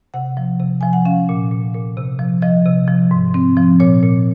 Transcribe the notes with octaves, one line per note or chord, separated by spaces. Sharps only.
C3 F#5
F3
C3
F3 G#5
F#5
C#4 F5
A#2
A#2
A#2
C3
F3
F3 D#5
C3
F3
G#2
C4
F3
A#2 C#5
A#2